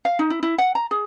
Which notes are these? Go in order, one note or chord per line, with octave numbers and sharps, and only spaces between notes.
F5
D#4
E4
E4
F#5
A#5
G#4